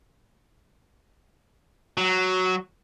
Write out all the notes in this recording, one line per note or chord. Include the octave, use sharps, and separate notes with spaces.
F#3